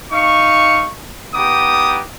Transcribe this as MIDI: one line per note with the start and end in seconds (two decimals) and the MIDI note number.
0.11 0.88 63
0.11 0.88 77
0.11 0.88 85
1.34 2.00 59
1.34 2.00 63
1.34 2.00 67
1.34 2.00 86
1.34 2.00 87